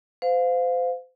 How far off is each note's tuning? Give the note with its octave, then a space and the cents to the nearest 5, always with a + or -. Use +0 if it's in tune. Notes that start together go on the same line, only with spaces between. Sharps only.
C5 -35 F5 +15